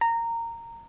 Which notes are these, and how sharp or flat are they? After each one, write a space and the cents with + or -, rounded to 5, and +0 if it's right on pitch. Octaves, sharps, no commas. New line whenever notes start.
A#5 -15